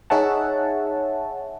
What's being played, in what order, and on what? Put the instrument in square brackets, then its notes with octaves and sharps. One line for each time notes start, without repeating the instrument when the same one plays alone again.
[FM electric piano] D#4 G#4 C#5 E5 F#5 A5